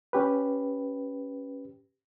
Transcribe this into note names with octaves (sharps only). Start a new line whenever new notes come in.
C#4 G4 B4